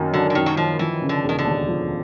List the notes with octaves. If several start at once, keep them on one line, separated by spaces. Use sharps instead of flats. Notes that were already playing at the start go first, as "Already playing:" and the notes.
Already playing: F#2 D#3 A#3
D3 F#3
D3
F#2 D#3
F#3
D#3 F3
E3 F3
C#3
D3
E1 D#3
D3
D#2
F3